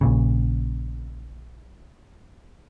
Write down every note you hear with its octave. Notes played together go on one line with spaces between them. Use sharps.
A#1 A#2 C#3